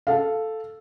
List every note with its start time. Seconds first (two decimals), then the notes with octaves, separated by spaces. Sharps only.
0.07 A4 F5